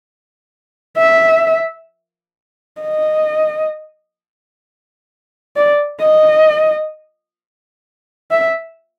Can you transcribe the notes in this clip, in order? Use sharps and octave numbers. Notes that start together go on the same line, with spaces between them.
E5
D#5
D5
D#5
E5